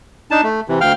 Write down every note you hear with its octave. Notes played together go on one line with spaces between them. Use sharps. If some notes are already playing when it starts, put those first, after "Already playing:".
D4 D#4 A5
A3
C3 E3
D2 F5 G5 F6